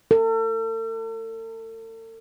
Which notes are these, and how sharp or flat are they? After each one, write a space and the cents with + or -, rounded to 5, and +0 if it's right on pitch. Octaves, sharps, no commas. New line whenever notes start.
A4 +40